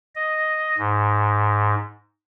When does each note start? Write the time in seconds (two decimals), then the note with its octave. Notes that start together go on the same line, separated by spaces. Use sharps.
0.15 D#5
0.78 G#2